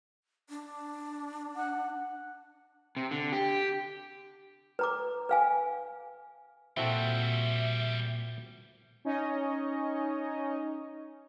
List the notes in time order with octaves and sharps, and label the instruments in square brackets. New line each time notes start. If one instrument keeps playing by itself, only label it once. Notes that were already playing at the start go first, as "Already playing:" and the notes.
[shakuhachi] D4
[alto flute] F#5
[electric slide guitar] C3
D3
G4
[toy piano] B4 A#5 D6
B4 F5 G#5
[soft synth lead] A#2 [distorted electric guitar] F3 G3 [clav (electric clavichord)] C4 F#4 A4 [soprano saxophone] E5
[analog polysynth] C#4 D#4 C#5 D#5